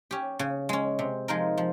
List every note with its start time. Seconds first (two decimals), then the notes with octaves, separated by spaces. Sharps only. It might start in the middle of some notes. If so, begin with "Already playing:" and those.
0.11 C#4 G4
0.39 C#3
0.69 G#3 C#4
0.99 C3
1.28 F3 G#3 D#4 A#4
1.58 F3